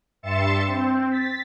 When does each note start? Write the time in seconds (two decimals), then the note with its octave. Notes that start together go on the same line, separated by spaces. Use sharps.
0.23 G2 E5 C6 A6 C#7 E7
0.67 C4
1.09 A6 B6